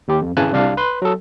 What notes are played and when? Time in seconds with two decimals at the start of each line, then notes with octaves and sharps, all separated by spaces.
0.08 D#2 G4
0.22 F2
0.37 G#1 C#3 E3 G#5 A5 F#6
0.52 C2 C3 D4 D5 F5
0.77 B4 C6
1.02 F#3 A4